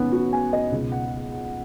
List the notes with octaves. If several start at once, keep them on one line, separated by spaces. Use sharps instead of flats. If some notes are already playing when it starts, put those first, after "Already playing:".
Already playing: G#1 G#2 D#3 B3 C#4
F#4
G#5
D#5
C#2 B2
F#5